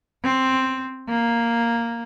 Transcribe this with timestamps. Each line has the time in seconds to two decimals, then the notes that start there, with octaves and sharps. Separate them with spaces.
0.24 C4
1.09 A#3